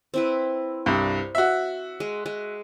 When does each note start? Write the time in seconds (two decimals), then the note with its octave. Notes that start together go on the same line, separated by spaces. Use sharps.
0.14 C4 E4 B4
0.86 C2 G2
1.35 F#4 E5
2.00 G#3
2.26 G#3